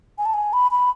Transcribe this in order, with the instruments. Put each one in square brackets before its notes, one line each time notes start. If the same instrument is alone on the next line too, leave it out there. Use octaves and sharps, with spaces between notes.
[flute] G#5
A5
G#5
B5
B5